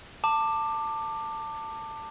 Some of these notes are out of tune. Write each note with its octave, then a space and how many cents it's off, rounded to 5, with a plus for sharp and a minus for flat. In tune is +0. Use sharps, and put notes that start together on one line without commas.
A5 +20 D6 +15